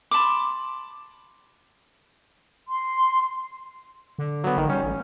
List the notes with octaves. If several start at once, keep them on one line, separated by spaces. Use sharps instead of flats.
A5 B5 C6 D6
C6
D3
F#3 B3
A1 D#3
G3 C#4
A1